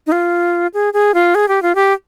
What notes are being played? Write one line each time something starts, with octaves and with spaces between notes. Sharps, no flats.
D#4
F4
G#4
G#4
F4
G#4
G4
F4
G4